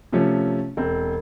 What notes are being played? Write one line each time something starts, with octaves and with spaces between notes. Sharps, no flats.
C3 F3 A3 C#4
E1 C4